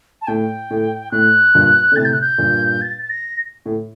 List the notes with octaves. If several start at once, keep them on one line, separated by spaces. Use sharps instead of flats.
A5
A2 G5
A2
A2 F#6
G2 A#2
D3
A2 C3 A6
G6
F#6
G6
G2 A#2
A6
A6
A#6
A2